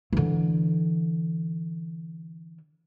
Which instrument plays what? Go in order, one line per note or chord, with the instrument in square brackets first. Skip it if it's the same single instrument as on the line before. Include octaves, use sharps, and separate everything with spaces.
[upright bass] D3 E3